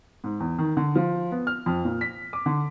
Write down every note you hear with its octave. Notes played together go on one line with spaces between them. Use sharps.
G#2
E2
D#3
D3
F3
B3
F6
F2
A#2
B6
D6
D3